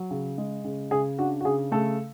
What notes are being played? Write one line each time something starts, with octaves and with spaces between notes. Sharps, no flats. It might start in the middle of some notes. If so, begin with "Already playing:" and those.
Already playing: F#3
C#3
G#3
C#3
C#3 G#4
D4 F#4
F#4
C#3 G#4
C#3 A3 A4